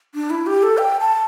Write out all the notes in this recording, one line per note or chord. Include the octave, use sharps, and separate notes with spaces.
D4
E4
G4
A4
G5
A5